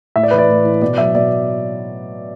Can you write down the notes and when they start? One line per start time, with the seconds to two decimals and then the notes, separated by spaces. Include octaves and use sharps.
0.16 A2 E5
0.23 D5
0.31 E3 B4
0.38 D5
0.48 A2
0.65 E3
0.82 B2 D5
0.98 F#3 E5
1.14 B2 D5